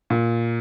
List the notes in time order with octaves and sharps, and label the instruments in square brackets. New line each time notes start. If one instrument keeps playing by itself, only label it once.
[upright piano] A#2